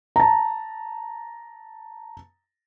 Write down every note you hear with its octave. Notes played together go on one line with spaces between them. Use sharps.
A5 A#5